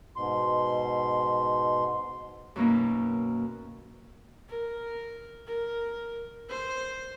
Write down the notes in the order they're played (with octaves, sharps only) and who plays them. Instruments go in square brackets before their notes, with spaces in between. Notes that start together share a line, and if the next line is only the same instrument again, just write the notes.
[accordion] G#2 B2 C6
[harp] F#2 B2 A#3 D#4
[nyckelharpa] A#4
A#4
C5